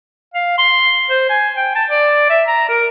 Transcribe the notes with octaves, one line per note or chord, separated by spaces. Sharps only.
F5
C6
C5
G#5
G5
A5
D5
E5
A#5
A#4